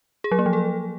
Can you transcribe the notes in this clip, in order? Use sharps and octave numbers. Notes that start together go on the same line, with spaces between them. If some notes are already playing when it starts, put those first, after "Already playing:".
G#4
F#3
A#3
F3
A4